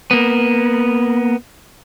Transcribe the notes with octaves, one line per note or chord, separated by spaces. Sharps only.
A#3 B3